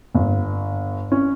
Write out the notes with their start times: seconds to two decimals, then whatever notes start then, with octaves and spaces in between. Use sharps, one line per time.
0.15 G1
1.12 C#4